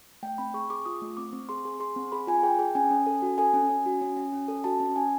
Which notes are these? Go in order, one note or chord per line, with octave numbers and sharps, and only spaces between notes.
A3 G5
C4 B5
G#4 C#6
G#4 D6
F4 D#6
A3
C4 D6
C4
G#4 C6
G#4
G#4 C6
C4
G#4 B5
F4 G#5
G#4 G5
G#4 G5
C#4 G#5
C#4
A4
F#4
A4 G#5
C#4
C#4
F#4
C#4
C#4
C#4
A4
F#4 A5
C#4
C#4 G#5